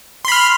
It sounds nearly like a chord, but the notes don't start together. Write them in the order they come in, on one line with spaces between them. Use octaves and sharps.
C6 B5 F6